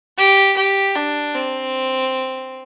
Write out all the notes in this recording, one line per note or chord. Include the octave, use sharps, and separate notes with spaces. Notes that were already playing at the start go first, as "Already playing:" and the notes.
G4
G4
D4
C4